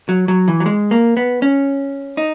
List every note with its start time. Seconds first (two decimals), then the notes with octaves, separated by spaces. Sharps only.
0.09 F#3
0.28 F#3
0.48 E3
0.60 F#3
0.66 G#3
0.91 A#3
1.17 B3
1.42 C#4
2.17 D#4